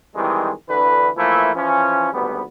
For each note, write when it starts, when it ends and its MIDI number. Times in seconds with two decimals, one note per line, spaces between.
0.16 0.50 51
0.16 0.50 52
0.16 0.50 55
0.16 0.50 56
0.16 0.50 60
0.69 1.09 38
0.69 1.09 50
0.69 1.09 52
0.69 1.09 71
1.16 1.53 52
1.16 1.53 53
1.16 1.53 57
1.16 1.53 58
1.16 1.53 64
1.55 2.12 52
1.55 2.12 53
1.55 2.12 61
2.13 2.41 32
2.13 2.41 38
2.13 2.41 55
2.13 2.41 59